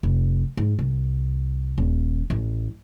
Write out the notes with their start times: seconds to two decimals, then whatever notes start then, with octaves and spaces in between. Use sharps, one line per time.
0.03 F1
0.57 G#2
0.79 C2
1.78 D#1
2.30 A1